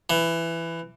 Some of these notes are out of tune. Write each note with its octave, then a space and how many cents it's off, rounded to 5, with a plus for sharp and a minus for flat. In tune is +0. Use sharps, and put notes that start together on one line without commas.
E3 +15